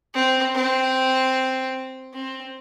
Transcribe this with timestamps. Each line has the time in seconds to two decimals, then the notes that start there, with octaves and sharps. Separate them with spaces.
0.14 C4
0.54 C4
2.13 C4